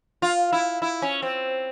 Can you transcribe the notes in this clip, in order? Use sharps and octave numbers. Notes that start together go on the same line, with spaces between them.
F4
E4
E4
C#4
C4